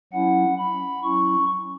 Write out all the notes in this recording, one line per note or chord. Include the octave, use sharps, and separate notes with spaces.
F#3 C#4 E4 F#5
B5
F#3 C#4 E4 C#6